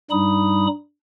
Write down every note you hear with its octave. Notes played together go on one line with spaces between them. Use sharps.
G2 G3 D#4 B5 D#6